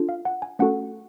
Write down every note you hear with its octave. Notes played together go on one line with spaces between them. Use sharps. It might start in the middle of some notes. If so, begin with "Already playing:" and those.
Already playing: D4 F4 A4
F5
F#5
G#5
A3 C#4 F#4 A4 F#5